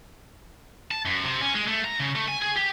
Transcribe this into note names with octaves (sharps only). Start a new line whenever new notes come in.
A5
F#2
C3
C#4
G#3
A3
A#5
C#3
A3
G#5
G#4
G4